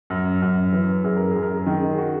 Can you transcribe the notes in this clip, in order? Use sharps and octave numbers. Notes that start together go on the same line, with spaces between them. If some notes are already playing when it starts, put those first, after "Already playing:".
F#2
F#2
E3
F#2 G#4
A#4
F#2 G#4
A#4
G#4
D#3
G#4
F#4